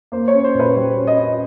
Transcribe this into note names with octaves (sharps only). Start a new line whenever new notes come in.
A#3 C5
C#5
C#4
C5
A#2
B4
G3 C5
C#4
D#5
C#4